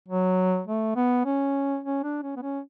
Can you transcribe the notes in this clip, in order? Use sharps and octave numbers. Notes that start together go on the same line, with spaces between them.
F#3
A3
B3
C#4
C#4
D4
C#4
B3
C#4